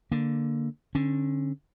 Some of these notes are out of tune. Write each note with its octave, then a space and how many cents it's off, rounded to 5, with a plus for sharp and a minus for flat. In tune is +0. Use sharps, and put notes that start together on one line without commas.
D3 +0 A#3 +0
D3 +0 C#4 -30